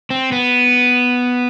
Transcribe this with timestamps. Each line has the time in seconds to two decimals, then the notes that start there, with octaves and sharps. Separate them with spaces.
0.10 C4
0.32 B3